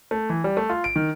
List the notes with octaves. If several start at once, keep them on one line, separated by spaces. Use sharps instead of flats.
A3
E3
G3
A3
F4
D7
D#3